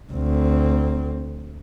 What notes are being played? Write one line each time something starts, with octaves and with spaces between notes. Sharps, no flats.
D2 C4